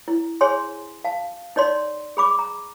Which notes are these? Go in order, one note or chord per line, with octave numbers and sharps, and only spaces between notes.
E4
G#4 C5 C#5 G#5 C6
F5 A5
D#4 C#5 D5 C6
G#4 B5 D6
A#5